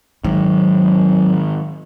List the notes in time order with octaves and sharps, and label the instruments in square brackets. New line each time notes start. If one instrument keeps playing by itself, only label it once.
[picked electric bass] G#2 D#3 [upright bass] F#3